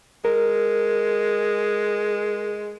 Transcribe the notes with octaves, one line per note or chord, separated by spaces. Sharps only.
G#3 A#4